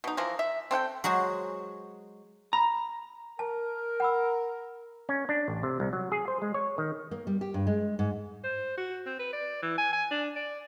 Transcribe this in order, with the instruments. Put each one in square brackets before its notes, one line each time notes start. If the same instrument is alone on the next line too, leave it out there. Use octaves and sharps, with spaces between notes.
[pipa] B2 D#4
E3 F3 A#4
E5
C4 A4 F#5 G5
[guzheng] F#3 G#3 F#4 G#4 C5
[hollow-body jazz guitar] A#5 [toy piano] B5
[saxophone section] A#4 [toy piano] A5
[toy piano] F#5 B5 E6
[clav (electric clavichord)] C#4
D4
A1
C3
C2
F#3
G#4
C5
G#3
C#5
D#3
[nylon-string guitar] A#3
G3
G4
G2
G#3
G#2
[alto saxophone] C5
F#4
C4
B4
D5
E3
G#5
G#5
D4
D5